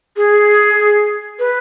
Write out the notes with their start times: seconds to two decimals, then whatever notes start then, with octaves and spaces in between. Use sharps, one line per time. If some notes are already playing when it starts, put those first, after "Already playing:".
0.17 G#4
1.39 B4